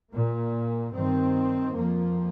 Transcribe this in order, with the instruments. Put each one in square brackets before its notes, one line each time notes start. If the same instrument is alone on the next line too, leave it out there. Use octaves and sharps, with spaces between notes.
[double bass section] A#2 A#3
G2 D#3 C4
F2 F3 A#3